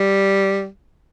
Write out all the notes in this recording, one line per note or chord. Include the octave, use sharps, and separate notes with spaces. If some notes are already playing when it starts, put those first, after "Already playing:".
Already playing: G3